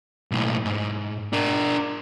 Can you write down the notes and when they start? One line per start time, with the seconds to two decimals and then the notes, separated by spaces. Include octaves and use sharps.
0.31 B1 A2
0.65 G#2
1.33 D4 A#4